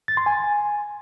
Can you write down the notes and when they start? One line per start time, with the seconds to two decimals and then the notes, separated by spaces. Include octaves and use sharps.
0.08 A6
0.17 C6
0.26 G#5